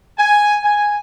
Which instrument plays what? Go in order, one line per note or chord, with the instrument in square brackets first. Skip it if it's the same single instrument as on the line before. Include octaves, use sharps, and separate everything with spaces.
[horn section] G#5
G#5